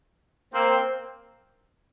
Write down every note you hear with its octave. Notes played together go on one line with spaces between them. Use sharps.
A#3 C4